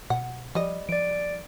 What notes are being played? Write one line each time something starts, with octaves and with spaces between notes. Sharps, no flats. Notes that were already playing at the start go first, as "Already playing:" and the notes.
B2 F#5
F3 G3 D#5
F3 D5 D7